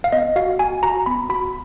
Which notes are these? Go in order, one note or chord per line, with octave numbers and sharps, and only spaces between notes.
F5
B3 D#5
F#4 F5
F#4 G#5
F#4 A#5
B3 B5
F#4 B5